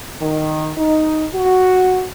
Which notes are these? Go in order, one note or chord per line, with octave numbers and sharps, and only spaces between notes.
D#3
D#4
F#4